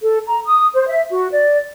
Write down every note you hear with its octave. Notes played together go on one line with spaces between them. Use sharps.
A4
A#5
D#6
C5
E5
F#4
D5